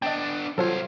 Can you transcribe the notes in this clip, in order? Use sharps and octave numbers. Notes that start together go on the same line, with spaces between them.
B3 D4 D#5 G5
C2 F#3 F4 A4 C5 C#5 F5